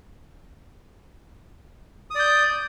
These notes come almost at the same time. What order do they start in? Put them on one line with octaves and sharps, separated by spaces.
D#6 D5 G6